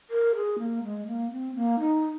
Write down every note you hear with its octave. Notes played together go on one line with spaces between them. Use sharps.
A#4
G#4
A#3
G#3
A#3
C4
A#3
D#4